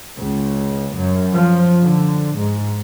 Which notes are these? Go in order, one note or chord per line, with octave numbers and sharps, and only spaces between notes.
C#2
F#2
F3
D3
G#2